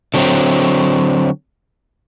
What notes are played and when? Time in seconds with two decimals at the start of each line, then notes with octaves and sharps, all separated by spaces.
0.14 D3 F#3 C4